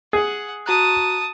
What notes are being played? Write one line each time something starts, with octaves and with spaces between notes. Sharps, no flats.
G#4 F#5
F#4 A5 A#5 D#6 F#6